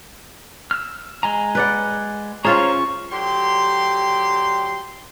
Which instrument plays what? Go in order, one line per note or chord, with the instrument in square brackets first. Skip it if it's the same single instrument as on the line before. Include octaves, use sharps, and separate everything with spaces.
[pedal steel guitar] E6 F6
G#3 G#5 A#5
[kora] B4 D5 F#5
[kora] C#4 F4 G#4 [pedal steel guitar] C5 C#5 A#5 [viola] C#6
[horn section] D3 F#3 G4 C6